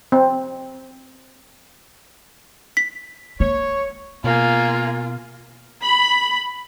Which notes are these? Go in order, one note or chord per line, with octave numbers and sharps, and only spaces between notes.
C4
B6
A#3 C#5
B2 A#3 F4 G#4
B5